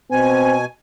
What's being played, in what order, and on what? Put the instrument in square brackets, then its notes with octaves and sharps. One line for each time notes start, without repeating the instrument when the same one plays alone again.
[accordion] B2 G#5 [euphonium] C4